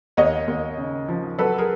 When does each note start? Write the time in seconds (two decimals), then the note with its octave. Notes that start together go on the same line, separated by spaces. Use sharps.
0.17 D#2 C#5 D#5
0.47 D#2
0.77 C#3
1.08 F3
1.38 F#3 A4 B4
1.58 G#4 A#4